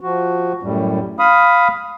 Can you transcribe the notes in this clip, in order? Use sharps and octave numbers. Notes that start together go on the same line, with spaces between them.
F3 F#4
F#2 A2 G3
F5 B5 D#6